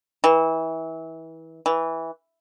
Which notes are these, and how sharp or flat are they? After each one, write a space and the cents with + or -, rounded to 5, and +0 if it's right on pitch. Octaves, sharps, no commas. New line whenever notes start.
E3 -25
E3 -10